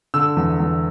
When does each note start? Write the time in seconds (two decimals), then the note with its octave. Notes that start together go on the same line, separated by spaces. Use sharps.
0.14 D3 E6
0.37 E2
0.60 E2